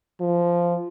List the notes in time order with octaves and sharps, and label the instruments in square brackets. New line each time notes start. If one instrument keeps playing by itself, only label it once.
[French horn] F3